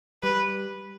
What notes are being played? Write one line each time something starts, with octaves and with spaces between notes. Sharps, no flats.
G3 B4